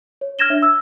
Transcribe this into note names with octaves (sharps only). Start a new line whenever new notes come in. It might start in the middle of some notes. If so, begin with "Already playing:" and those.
C#5
F6 G#6 A#6 E7 G7
D4 C#5 E5
E6